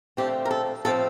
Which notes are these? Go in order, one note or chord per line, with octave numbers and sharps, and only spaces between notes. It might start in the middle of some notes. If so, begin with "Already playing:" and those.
D3 F3 A3 C4 G4
A#4
A4
A2 F3 C4 A4